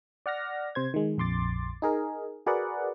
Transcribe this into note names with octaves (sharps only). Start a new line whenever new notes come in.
D5 F#5 F6 A#6
C3 C5 G#6
D#3 G#3
A#1 F2 C6 D6 A6
D#4 G#4 A#4
F#4 G#4 A#4 B4 D5 F#5